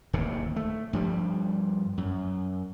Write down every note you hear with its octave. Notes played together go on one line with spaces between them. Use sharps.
D1 D#2 A2 C3
A3
G2 F3 G3
F#2